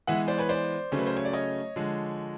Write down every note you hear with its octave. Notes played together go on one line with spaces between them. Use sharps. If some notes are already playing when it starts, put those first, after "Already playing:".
E3 G#3 B3 E5 F#5
C5 D5
B4 C#5
C5 D5
C#3 F#3 A3 C#4
B4
C5
C#5
D5
C#5 D#5
D3 F3 G#3